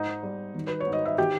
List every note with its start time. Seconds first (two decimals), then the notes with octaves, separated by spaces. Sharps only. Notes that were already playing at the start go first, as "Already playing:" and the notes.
Already playing: G#2 D#4 D#5
0.23 G3
0.54 D#3
0.67 B4
0.80 C#5
0.86 G#2
0.93 D#5
1.06 E5
1.18 D#3 G4 G5